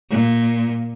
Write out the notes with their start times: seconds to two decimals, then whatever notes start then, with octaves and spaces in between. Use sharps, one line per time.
0.10 A#2